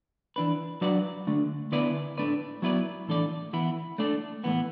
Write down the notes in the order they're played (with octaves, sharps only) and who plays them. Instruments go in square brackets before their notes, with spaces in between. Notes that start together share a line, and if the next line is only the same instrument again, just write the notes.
[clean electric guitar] E3 D4 B4
F#3 D4 F#4 B4 D5
D3 A3 D4
D3 B3 E4 B4 D5
A2 A3 D4 B4 D5
F#3 B3 E4 B4 D5
A2 E3 D4 A4 D5
E3 B3 E4 B4
A3 D4 A4 D5
A2 E3 B3